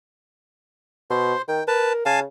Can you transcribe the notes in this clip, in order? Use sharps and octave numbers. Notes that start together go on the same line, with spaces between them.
B2 C5 C6
D#3 G5
A#4 B4 A5
C#3 F5 G#5 A5